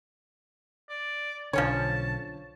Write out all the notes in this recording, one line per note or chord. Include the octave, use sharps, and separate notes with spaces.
D5
B1 D3 F3 C#4 C#5 A5